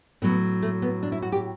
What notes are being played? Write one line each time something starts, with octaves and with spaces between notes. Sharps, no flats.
A2 F#3 B3
A3
B3
D4
E4
F#4
G4